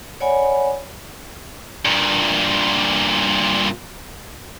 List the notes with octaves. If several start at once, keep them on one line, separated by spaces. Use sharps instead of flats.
C#5 D5 F#5 G#5 B5
G2 A#2